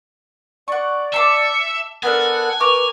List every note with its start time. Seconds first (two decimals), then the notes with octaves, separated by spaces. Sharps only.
0.68 D5 F#5 C#6
1.14 E5 A5 C6 D6 C#7
2.03 B3 D4 A4 A#4 F#5 G#5
2.60 A#4 B4 C#6 D6 F7